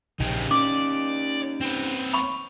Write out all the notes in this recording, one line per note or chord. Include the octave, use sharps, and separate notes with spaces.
A#1 C#3 C4 D#4 G4
C#4 D5 D6
C4 B4
B5 C#6